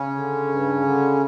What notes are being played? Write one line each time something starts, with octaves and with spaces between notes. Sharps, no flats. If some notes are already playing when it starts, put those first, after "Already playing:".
Already playing: C#3 C#4
D3
G2
D3